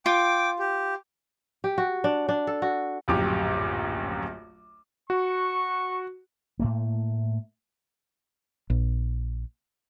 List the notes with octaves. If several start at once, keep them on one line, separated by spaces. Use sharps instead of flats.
F4 G5 D6
G4
G4
F#4
D4
D4
A4
F#4
D1 A#1 F#2 G4 D6
F#4 C#6
A2 A3 A#3
A#1